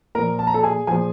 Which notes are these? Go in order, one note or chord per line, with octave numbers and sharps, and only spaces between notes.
A#2 F3 A#4 A#5
A5
A#5
A4 A5
G#4 G#5
A#2 F3 G#4 G#5